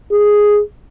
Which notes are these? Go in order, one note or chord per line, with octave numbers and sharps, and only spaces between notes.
G#4